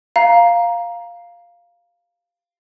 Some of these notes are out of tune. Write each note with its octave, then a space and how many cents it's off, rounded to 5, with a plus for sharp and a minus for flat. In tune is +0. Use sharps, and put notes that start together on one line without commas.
F5 +0 A#5 +10